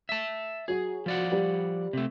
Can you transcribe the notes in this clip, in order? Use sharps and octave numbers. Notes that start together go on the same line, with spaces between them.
E5 A5
F#3 F#4 G#4
F3 D5 F#5
G3
C3 A3